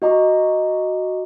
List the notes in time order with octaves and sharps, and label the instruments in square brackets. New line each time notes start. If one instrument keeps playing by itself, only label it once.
[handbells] F#4 D#5 A#5 D6